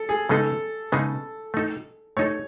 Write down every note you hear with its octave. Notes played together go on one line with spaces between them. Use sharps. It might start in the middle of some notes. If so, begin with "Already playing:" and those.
Already playing: A4
G#4
C#3 G#3 B3 D#4 G#4 A4
C#3 G#3 B3 D#4 G#4
A3 D#4 A4
A3 D#4 A4 C#5